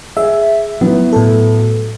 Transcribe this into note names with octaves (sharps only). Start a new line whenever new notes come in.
G#4 E5
F#3 B3 E4
A2 A4